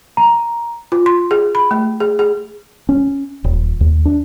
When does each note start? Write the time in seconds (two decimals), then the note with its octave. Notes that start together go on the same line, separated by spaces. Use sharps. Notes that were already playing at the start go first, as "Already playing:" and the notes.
0.17 A#5
0.92 F4
1.06 C6
1.31 G#4
1.55 B5
1.71 A3
2.00 G#4
2.19 G#4
2.89 C#4
3.44 D#1
3.81 D#2
4.05 D4